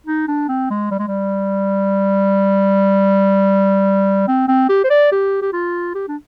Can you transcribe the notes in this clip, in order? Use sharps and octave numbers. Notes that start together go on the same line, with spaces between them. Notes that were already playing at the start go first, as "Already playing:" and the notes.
D#4
D4
C4
G#3
G3
G#3
G3
C4
C4
G4
C5
D5
G4
G4
F4
G4
D4